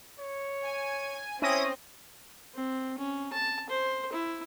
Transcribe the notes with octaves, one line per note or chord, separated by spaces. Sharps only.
C#5
G#5
C4 C#4 E4 D#6 A#6
C4
C#4
A5
C5
E4